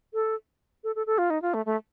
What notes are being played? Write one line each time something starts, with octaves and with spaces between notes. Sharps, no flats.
A4
A4
A4
A4
F4
D#4
F4
A3
A3